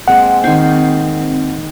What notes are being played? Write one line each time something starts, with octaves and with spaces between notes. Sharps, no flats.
G#3 A#3 C4 F#5
D#3 C4 G#5 C#6